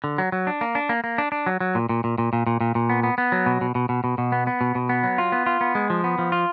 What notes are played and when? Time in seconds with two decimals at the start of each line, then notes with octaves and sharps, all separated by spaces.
0.04 D3
0.18 F#3
0.32 F#3
0.47 D4
0.61 A#3
0.75 D4
0.89 A#3
1.04 A#3
1.18 D4
1.32 D4
1.46 F#3
1.60 F#3
1.75 A#2
1.89 A#2
2.04 A#2
2.18 A#2
2.33 A#2
2.47 A#2
2.61 A#2
2.75 A#2
2.89 B3
3.03 B3
3.18 B3
3.32 F#3
3.46 B2
3.61 B2
3.75 B2
3.89 B2
4.04 B2
4.18 B2
4.32 B3
4.47 B3
4.61 B2
4.75 B2
4.89 B3
5.03 F#3
5.18 F4
5.32 B3
5.46 F4
5.61 B3
5.75 G#3
5.90 F3
6.04 B3
6.19 F3
6.32 F4